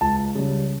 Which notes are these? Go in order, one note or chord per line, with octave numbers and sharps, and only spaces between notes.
C#2 A5
C#3 G3